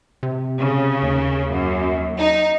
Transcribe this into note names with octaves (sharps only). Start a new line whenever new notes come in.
C3
C#3
D#2
F#2
D#4